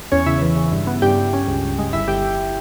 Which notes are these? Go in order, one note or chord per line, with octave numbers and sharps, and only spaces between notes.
E2 C#4 C#5
C#3 E4 E5
E3
C#3
G2
B3
G2 G4 G5
G2
C#4
C#2
C#2
G#3
G1 E4 E5
G1 G4 G5
G1